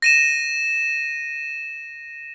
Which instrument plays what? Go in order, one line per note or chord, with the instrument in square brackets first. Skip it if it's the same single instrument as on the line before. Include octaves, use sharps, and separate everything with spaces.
[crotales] A#6 D#7 E7